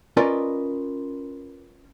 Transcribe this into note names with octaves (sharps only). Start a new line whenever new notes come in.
C#4 F4 A#4 B4 D5 D#5